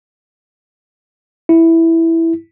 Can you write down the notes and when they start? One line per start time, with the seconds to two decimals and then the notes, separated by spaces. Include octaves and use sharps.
1.49 E4